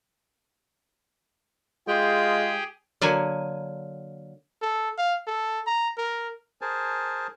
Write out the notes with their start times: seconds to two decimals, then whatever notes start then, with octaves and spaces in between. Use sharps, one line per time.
1.87 G#3 F4 G4 G#4 G5
3.01 D3 F#3 A#3 G#5
4.62 A4
4.98 F5
5.27 A4
5.67 A#5
5.98 A#4
6.61 G#4 A#4 C5 G#5 A5